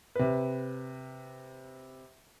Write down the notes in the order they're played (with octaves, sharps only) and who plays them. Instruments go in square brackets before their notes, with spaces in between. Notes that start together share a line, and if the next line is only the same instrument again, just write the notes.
[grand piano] C3 B4